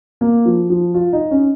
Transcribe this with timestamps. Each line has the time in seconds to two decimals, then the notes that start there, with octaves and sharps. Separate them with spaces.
0.21 A#3
0.45 F3
0.70 F3
0.94 F4
1.13 D#4
1.31 C#4